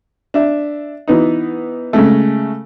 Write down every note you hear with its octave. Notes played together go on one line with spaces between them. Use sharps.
D4 E5
E3 B3 D#4
C#3 G#3 A3